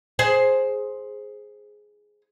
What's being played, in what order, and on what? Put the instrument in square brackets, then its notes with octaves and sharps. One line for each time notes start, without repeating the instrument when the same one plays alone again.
[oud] G#4 C5